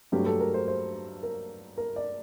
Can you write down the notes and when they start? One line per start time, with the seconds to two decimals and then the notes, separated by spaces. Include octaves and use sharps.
0.12 G2 F#3 A3 G4
0.26 A4
0.40 A#4
0.54 C5
0.68 C5
1.23 A#4
1.78 A#4
1.96 D5